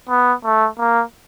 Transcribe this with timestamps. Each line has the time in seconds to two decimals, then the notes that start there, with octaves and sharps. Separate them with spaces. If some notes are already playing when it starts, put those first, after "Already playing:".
0.09 B3
0.44 A3
0.79 A#3